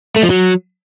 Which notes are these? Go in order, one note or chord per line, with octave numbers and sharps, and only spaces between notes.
A3
F3
F#3